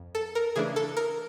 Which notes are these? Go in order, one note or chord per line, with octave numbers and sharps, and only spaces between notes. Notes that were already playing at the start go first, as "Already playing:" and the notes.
Already playing: F2
A4
A#4
C#3 E3 A3 D4 G#4
A4
A#4